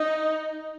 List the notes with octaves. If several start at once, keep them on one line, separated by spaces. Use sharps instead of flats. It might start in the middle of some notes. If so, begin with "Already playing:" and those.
Already playing: D#4